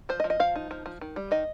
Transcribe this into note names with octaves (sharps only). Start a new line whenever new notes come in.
F3 C5
D#5
F3
D#5
F3 F5
D#4
F3
F3
D#3
G3
D#3 D#5